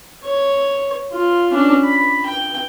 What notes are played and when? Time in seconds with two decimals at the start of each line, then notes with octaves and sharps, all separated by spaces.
0.25 C#5
1.12 F4
1.52 C#4 D4
1.84 B5
2.26 G5